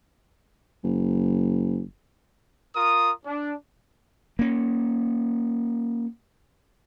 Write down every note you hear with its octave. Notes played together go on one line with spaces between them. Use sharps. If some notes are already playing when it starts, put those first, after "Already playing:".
F#1
F4 A#4 D#6
D4
A#3 C#4